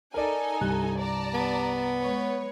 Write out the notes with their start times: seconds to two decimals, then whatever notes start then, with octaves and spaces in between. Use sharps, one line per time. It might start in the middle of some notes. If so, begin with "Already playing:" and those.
0.14 D#4 A4 A#4 D5 G#5
0.61 C2 G2 F#6
1.01 D5 A5 A#5
1.34 B3
2.02 G#3 B4 C#5